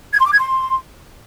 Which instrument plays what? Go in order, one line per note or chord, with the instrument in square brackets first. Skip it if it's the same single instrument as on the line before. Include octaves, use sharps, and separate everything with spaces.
[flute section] G#6
C6
D6
G#6
C6